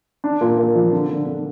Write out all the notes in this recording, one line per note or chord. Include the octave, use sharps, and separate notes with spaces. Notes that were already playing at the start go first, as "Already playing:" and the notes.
D4
A#2
A#2
F3
D3
D3
D3